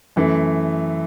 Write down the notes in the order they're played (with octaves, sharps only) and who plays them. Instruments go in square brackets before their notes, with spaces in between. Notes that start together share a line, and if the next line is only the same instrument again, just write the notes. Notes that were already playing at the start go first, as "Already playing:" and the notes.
[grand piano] F#2 E3 A3